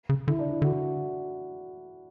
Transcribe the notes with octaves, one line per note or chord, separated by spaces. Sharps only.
C#3
D3 E4
D4
E4
D3 F#4